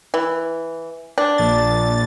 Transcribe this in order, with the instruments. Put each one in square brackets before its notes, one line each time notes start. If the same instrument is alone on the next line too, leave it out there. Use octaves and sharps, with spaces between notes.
[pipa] E3
D4
[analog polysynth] A#1 A6